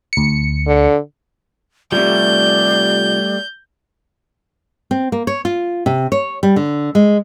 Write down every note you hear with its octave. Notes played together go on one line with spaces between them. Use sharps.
D2 C#7
D3
C3 F3 G3 A3 D5 G6
C4
A#3
C#5
F4
C3
C#5
G3
D3
G#3